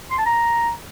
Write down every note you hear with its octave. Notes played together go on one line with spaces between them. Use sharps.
C6
A5
A#5